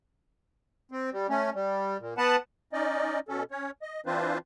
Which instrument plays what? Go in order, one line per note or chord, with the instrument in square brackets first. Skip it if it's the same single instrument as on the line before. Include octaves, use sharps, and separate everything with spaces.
[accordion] C4
G3
A3 C#4
G3
A#2
B3 B4 F#5 A5
C#4 D#4 D5 D#5
B2 C#4 A4
C#4 C#5
D#5
E3 C4 D4 F4 B4 C5